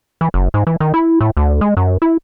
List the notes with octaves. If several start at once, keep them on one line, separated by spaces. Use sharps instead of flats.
E3
F#1
G#2
E3
D#3
E4
A2
D2
G#3
F#2
E4